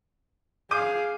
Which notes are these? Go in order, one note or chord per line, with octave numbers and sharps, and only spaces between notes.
G#4 F5 D6 G6 D#7